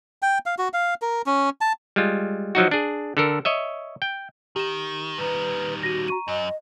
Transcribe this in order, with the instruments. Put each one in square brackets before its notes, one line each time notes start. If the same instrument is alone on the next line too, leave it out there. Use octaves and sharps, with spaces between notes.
[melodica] G5
F5
F#4
F5
A#4
C#4
A5
[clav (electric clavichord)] G3 G#3 F4
F3 F#3 D#4 F#4
D4 G#4
D3 A4 A#4
C#5 D#5 E5
G5
[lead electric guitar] D#3 [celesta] G4 E7
[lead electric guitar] D#3 G3 [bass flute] B4
[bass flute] F#4 [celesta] A#6 D#7
[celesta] A#5 C#6 D#7
[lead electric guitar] F#2 F#3 [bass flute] D#5